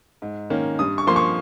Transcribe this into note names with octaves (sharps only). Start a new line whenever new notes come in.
G#2
D#3 A#3 C#4
G2 D#6
C#6
F3 A#3 C6
C#6